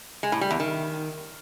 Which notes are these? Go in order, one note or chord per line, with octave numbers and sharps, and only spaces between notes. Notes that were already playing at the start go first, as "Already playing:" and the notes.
G#3
A2
G3
E2
D#3